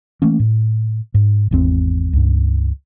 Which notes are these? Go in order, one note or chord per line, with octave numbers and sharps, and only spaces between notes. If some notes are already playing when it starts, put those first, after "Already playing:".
E3 A3 A#3 C#4
A2
G#2
G#1 E2 C4
C#2 G2